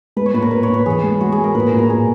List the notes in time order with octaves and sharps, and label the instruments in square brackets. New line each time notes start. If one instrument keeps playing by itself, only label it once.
[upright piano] G#3 [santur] B4
[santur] C#5
[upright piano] A#2 [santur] B4
[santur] A#4
[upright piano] A#2 [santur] B4
[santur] C#5
[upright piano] A#2
[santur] B4
[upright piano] E3 [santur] G#4
[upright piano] G#3
[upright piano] G#3 [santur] F#4
[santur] G#4
[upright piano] G#3
[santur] A#4
[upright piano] A#2 [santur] B4
[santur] A#4
[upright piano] A#2
[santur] A#4
[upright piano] A#2 [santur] G#4